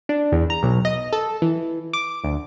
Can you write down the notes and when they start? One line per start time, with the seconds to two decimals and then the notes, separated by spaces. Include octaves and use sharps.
0.09 D4
0.32 E2
0.50 A#5
0.63 B1
0.85 D#5
1.13 A4
1.42 E3
1.93 D6
2.24 D2